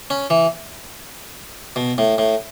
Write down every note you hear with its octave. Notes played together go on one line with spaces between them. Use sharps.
C#4
E3
B2
A2
A2